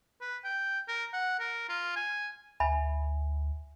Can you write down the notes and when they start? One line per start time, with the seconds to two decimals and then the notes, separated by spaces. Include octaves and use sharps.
0.21 B4
0.44 G5
0.88 A#4
1.13 F#5
1.39 A#4
1.69 F4
1.96 G#5
2.60 D2 E5 G#5 B5